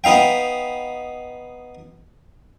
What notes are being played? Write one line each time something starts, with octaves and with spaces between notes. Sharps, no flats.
B3 D#4 F5 G5